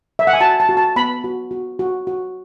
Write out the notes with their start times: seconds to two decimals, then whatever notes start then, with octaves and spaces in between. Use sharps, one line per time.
0.19 E5
0.27 F#5
0.33 G#5
0.41 F#4 A5
0.60 A5
0.69 F#4
0.77 A5
0.96 B3 B5
1.24 F#4
1.51 F#4
1.79 F#4
2.07 F#4